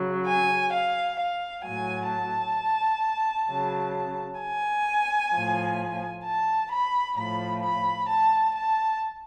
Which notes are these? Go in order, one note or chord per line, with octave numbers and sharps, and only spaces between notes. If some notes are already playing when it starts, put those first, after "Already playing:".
Already playing: C#3 F#3
G#5
F5
F5
A2 F#3 G#5
A5
C#3 F#3
G#5
A2 F3
A5
B5
A2 F3 B5
B5
A5
A5